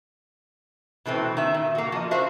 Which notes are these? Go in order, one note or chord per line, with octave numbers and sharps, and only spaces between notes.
B2 E3 A3 C4
D#3 E5
A#2
A#3 F#4
F3 D#5
F#4 A#4 C5 E5 F5